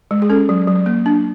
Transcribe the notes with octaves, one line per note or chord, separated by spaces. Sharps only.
G#3
G#4
C#4 A4
F#3
F#3
A#3
D4